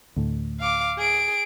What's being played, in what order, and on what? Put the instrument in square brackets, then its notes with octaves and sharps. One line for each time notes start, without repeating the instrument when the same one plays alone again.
[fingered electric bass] D2 A2
[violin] F5 D6
G#4 D7